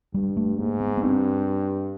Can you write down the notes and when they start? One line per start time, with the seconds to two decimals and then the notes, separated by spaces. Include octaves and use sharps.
0.14 G2 G3
0.37 A3
0.58 G#2 A#3
0.80 B3
0.98 B3
1.03 G2 C4